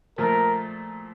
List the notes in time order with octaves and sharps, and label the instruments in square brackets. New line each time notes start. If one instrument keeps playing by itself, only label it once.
[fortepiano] A#2 F3 A3 [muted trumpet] A#4